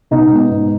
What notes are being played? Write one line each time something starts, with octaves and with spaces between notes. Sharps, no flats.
B2 D#4
G#3 B3
G#2